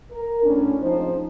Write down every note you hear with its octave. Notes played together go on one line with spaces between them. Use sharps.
A#4
A2 C#4 D4
F3 G#3 C4 D#4 C5